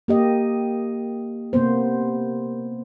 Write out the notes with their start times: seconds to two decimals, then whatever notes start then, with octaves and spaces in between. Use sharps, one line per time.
0.08 A#3 G4 D#5
1.53 C3 A#3 B3 C5